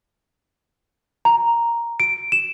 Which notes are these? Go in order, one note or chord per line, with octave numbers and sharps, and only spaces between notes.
A#5
D7
E7